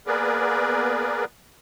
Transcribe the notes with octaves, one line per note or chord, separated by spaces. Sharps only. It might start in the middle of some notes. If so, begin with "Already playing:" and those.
A#3 B3 G#4 A#4 B4 D5